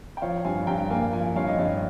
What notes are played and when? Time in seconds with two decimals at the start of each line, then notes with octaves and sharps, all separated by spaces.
0.17 G5
0.22 F3 C#5 F5
0.45 G2 F5 G#5
0.67 G2 G5 A#5
0.90 A#3 F5 G#5
1.13 F3 F5 G#5
1.36 G2 C#5 F5
1.48 D#5
1.58 G2 C#5 F5